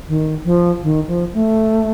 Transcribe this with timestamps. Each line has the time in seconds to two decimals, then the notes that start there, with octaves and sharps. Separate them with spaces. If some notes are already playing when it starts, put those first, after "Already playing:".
0.08 D#3
0.45 F3
0.83 D#3
1.07 F3
1.33 A3